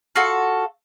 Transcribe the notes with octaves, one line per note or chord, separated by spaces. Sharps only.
F4 F#4 A4